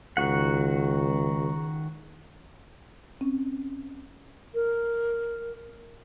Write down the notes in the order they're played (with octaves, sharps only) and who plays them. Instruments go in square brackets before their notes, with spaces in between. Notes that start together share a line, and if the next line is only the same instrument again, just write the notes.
[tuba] C#2 [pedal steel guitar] D#3 F#4 F#5
[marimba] C4 C#4
[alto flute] A#4